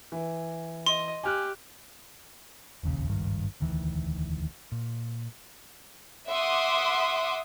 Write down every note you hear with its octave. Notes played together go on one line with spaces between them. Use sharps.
E3
D#5 C6
G4 G#5 F6 F#6
E1 A#1 D#2 C#3
G#1 C#2 G2 D#3
E1 D2 D#3 E3
A#2
E5 F#5 C6 D6 D#6